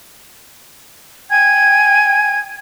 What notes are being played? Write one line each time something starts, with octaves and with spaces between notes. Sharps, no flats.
G5 G#5 G#6